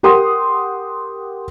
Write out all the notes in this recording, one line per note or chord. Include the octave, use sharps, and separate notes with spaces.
G4 A#4 F#5 G5 C6 D#6